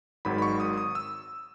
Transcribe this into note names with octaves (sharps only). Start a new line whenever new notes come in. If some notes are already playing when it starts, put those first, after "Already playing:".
G#1 G#2 D#3 F#3 B5
B5
C#6
D#6
D#6
E6